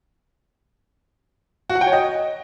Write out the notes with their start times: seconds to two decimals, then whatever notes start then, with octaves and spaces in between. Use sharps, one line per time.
1.70 F#4
1.75 F#5
1.81 G5
1.87 C#5
1.93 D#5